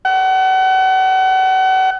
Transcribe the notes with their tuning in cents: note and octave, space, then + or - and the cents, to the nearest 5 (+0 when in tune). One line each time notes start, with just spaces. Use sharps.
F#5 +35